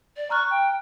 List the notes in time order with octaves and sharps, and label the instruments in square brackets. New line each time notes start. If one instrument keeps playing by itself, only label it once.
[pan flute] D5
[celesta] A#5 F6 F#6 [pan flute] C#6
[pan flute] G5